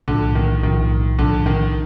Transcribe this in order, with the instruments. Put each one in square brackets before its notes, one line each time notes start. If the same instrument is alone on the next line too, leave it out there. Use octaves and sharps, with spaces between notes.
[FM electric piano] B1 A2 F3 [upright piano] D3
[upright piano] D#3
[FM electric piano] B1 A2 F3 [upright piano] D#3
[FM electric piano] B1 A2 F3 [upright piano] D3
[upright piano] D#3